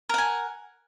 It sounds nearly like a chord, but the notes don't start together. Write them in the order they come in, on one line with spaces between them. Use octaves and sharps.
A#4 F#5 G#5